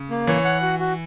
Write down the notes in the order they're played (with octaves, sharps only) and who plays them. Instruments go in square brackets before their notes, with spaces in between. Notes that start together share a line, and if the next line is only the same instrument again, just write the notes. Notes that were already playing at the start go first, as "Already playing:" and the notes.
Already playing: [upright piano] C#3
[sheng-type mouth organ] A#3
[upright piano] E3 [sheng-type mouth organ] C#5
[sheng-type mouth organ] F#5
F#4
F#4